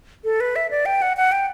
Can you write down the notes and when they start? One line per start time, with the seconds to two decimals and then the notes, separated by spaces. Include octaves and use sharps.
0.24 A4
0.40 B4
0.56 E5
0.71 D5
0.86 G5
1.02 F#5
1.17 F#5
1.32 G5